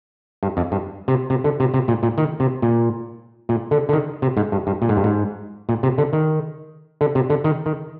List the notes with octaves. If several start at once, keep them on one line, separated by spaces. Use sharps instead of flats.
G2
F2
G2
C3
C3
D3
C3
C3
A#2
A#2
D#3
C3
A#2
A#2
D3
D3
D#3
C3
G#2
G2
G2
A#2
G#2
G2
G#2
A#2
C3
D3
D#3
D3
C3
D3
D#3
D#3